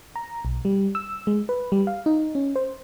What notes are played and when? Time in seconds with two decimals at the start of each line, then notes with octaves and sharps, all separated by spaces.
0.16 A#5
0.45 B1
0.65 G3
0.95 E6
1.27 G#3
1.49 B4
1.72 G3
1.87 F5
2.06 D#4
2.35 C#4
2.56 C5